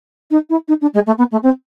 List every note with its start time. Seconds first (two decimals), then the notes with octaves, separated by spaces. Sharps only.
0.30 D#4
0.49 E4
0.68 D#4
0.81 D4
0.94 G#3
1.06 A3
1.18 B3
1.31 A3
1.43 C4